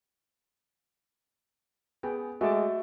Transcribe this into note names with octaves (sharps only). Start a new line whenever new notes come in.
B3 G#4 G5
G#3 A3 F#4 E5 A5 D6